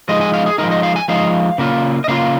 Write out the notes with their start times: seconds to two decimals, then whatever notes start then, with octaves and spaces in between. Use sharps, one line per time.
0.09 F3 G#3 D#4 D#5
0.21 G#5
0.34 F5
0.46 G#4
0.58 F3 G#3 D#4 A#4
0.71 D#5
0.83 F5
0.96 G#5
1.08 F3 G#3 D#4 F5
1.58 C#3 A#3 F4
2.04 D#5
2.08 C#3 A#3 F4 F5